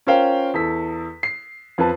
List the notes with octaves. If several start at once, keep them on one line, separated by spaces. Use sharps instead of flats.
C#4 F4 A#4 C5 F5 G5
E2 A4 B6
C7
F2 B4 A5